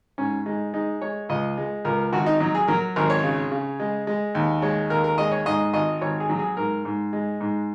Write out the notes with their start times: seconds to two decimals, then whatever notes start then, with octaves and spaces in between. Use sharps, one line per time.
0.18 G#2 C#4
0.46 G#3 D#4
0.74 G#3 D#4
1.01 G#3 C#5
1.29 C#2 D#5
1.58 G#3
1.85 C#2 A#4
2.12 G#1 F#4
2.26 D#4
2.40 F#3 D#4
2.54 G#4
2.68 F#3 A#4
2.96 G#1 A#4
3.10 C#5
3.23 C#3
3.51 C#3
3.80 G#3
4.07 G#3
4.35 D#2
4.62 G#3 C#5
4.90 D#2 A#4
5.04 A#4
5.18 G#3 D#5
5.32 C#5
5.46 G#2 D#5
5.73 G#1 D#5
6.01 G#1 C#5
6.20 G#4
6.29 F#3
6.39 G#4
6.57 G#2 A#4
6.85 G#2
7.13 G#3
7.41 G#2